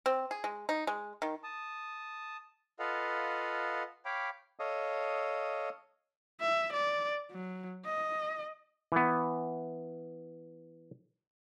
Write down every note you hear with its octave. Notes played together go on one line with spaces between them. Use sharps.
C4
G#4
G#3
D#4
G#3
D#3
A5 D#6
F4 A4 B4 D#5 F5 F#5
C#5 F5 G5 B5 D6
A4 C#5 D#5 F5 D#6
E5
D5
F#3
D#5
E3 B3